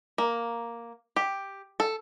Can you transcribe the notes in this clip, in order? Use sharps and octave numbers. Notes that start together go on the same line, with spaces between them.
A#3
G4
A4